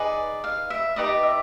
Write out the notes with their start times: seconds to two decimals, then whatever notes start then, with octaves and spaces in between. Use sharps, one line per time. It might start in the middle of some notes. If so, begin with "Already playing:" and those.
Already playing: D#4 G#4 B4 D5
0.44 F5
0.70 E5
0.96 D#4 G4 B4 D5 D#5
1.23 E5